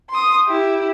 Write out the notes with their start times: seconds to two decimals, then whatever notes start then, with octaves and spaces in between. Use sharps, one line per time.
0.11 C6 D#6
0.47 E4 G4